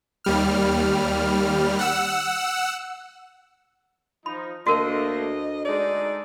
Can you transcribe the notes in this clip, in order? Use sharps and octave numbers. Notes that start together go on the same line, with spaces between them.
D#2 G3 F6
F#5 E6
F3 D#4 B5
D2 A3 A#3 D4 F#4 A#4 D#5
G#3 D#4 A4 D5